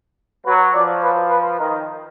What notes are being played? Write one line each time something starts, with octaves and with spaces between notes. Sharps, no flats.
F#3 B4
F3 D5
B4
B4
D#3 A#4